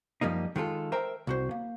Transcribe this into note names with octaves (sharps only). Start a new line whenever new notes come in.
F#2 F3 G3 A#3 D#4
D#3 G#3 F4 A4
A#4 C5 E5 G5 A#5
C2 F#4 C5
A#3